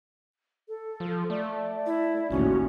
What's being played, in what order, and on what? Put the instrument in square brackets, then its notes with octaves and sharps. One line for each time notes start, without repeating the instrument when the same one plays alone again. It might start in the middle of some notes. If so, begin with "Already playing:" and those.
[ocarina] A4
[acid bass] F3
[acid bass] A3 [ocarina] D5
[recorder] E4
[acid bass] A1 [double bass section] D#2 A2 [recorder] C#4 [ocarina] F#4